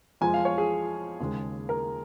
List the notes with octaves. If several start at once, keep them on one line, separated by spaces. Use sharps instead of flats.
F2 F3 G#3 G#5
F5
C#5
G#4
D#2 C#3 G#3
A#4